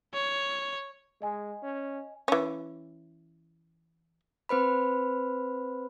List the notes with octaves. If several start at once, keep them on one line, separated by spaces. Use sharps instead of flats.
C#5
G#3 D#5 G#5
C#4
E3 C#4
C4 B4 C5 B5